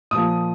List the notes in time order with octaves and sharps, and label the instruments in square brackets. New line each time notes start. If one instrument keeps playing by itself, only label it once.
[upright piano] A#2 F3 D#6